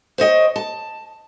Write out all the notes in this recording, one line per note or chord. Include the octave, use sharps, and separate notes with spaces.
C5 C#5 D#5 G5
A5